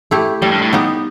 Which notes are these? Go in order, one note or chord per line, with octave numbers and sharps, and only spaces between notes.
A3 E4 G4
A2 G3
G2
A2
B3 D#4 G4